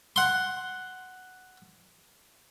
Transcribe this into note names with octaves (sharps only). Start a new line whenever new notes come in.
F#5 C6